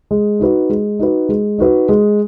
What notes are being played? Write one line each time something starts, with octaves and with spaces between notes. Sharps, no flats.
G#3
D#4 F#4 B4
G#3
D#4 F#4 B4
G#3
D#4 F#4 B4
G#3